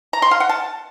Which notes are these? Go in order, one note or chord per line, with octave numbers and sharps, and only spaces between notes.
A#5
C6
F5
F#5
A5